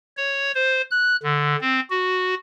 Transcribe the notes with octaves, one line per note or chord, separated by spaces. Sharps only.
C#5
C5
F#6
D3
C4
F#4